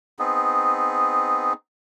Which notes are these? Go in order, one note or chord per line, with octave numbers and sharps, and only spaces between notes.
B3 C4 D#4 G#4